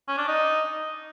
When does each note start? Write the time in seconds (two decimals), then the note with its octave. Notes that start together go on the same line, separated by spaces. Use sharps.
0.08 C#4
0.18 D4
0.28 D#4